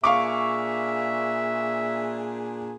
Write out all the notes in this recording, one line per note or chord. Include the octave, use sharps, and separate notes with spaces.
A#2 D4 G#4 E5 F5 C#6 D6